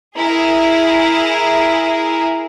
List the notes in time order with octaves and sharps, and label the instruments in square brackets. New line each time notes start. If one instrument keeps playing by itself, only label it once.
[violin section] E4 G#4 A#4